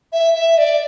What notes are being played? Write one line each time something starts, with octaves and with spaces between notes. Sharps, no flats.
E5
E5
D5